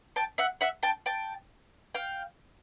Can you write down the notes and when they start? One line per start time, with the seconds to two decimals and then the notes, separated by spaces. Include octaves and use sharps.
0.16 G5 A5
0.38 E5 F#5
0.61 E5 F#5
0.83 G5 A5
1.06 G5 A5
1.94 F5 G5